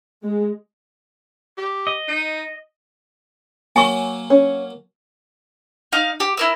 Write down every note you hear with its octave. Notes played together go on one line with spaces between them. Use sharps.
G#3
G4
D#5
D#4
F#3 A#3 G#5 C#6
C#4
D#4 F5
G4
E4 A#4 E6